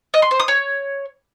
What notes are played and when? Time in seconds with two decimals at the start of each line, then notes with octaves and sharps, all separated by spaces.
0.14 D#5
0.22 C6
0.31 C5
0.40 D#6
0.48 C#5